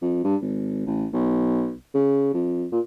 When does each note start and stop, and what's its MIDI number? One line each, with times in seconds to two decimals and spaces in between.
0.02 0.21 41
0.24 0.36 43
0.42 0.84 32
0.86 1.07 33
1.13 1.74 35
1.94 2.32 49
2.34 2.65 41
2.72 2.80 46